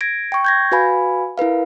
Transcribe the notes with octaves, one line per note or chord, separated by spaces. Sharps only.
G#6 A#6 D7
G5 C#6
G6 G#6 A#6
F#4 B4 F5 G#5 B5
E4 A#4 B4 F5